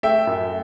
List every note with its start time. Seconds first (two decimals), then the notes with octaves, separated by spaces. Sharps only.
0.03 A3 E5 G5
0.27 F#2